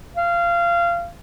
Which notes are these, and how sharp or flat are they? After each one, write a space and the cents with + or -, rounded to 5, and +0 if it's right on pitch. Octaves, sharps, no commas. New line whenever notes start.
F5 -20